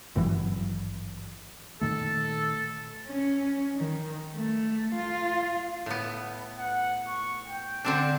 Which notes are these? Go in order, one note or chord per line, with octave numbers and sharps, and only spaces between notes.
G#1 G2 E3 F#3
A#2 D#3 A3 A4
C#4
D#3
A3
F4
A2 B3
F#5
C#6
G5
D3 C4 D4